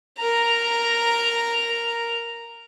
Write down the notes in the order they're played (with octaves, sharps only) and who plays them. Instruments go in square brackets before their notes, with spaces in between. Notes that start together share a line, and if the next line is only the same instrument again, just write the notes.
[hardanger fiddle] A#4 A#5